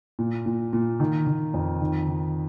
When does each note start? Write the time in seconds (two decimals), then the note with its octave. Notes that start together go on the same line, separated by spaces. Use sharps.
0.19 A#2
0.46 A#2
0.73 A#2
1.00 D#3
1.27 D#3
1.54 F2
1.81 D#3
2.08 D#3